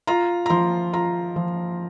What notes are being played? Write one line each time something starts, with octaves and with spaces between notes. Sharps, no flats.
F4 A#5
A#5
F3 C6
F4 A#5
F3